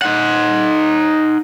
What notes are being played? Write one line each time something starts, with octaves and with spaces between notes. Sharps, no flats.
D#4 F#5